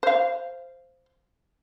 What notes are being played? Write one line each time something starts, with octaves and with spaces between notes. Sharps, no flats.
C5 F5